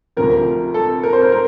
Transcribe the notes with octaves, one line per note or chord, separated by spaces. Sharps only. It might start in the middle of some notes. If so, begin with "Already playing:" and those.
D2 C3 F3 A#4
A4
A#4
C5
A#4
A#4